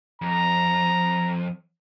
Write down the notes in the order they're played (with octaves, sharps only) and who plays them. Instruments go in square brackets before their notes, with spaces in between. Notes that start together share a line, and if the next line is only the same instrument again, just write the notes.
[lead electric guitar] F2 [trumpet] A#5